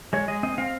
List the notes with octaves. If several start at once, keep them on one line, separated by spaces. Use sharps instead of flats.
G#3 C#5
G#3 D#5
C4 D#5
C4 F5